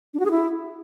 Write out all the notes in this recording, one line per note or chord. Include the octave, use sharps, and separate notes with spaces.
D4
F#4
G#4
E4